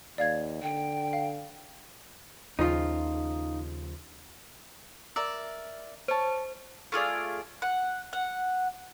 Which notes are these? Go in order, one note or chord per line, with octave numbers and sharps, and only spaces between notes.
D#2 D5 F5 G#6
D3 G5
F5
D#2 C#3 F3 D#4 F4
A#4 D5 E5
C5 C#5 A5
A3 F4 G#4 D5
F#5
F#5